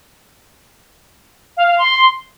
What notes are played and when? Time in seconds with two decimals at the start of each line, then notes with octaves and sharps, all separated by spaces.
1.57 F5
1.68 F5
1.78 C6